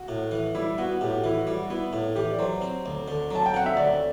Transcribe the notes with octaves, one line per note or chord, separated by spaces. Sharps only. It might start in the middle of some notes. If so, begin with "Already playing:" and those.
Already playing: F#4
A2
E3
G3 E4
B3 F#4
A2 G4
F#4
E3 E4
F#4
G3
F#4
B3 E4
A2
E3 G4
D5
F#3 C5
C4
D2
D3
F#3 A5
G5
C4 F#5
E5
D2 D5